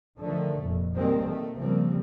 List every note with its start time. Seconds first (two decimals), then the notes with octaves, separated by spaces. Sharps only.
0.19 D3 D#3 F3 A3
0.62 F1 F2 A#2
0.95 B2 D#3 G3 G#3 A#3 C4
1.25 D#3 A3 A#3
1.59 C#3 F3 G3 A#3 C4